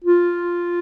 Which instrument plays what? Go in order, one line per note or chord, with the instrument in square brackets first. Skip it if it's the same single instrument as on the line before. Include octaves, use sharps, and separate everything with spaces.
[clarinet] F4